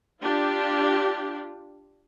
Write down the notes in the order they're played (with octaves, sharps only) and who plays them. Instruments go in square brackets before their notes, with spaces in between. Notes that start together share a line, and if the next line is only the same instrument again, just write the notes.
[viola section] D4 F4 G4